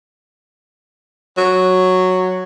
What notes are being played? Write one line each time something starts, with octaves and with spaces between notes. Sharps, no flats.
F#3